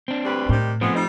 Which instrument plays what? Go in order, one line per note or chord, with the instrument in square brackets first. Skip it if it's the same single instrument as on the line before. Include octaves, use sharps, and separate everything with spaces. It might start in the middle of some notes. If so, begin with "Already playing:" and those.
[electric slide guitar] C4 D4
[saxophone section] D2 G3 B4
[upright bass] A2 [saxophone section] C3 D#3 G3
[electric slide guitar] F3 A3 C4 [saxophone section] G#3 B3
[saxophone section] G3 D#4